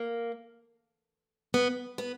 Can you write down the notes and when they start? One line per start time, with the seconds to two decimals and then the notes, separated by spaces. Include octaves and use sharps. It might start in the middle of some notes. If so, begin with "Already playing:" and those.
Already playing: A#3
1.54 B3
1.98 B3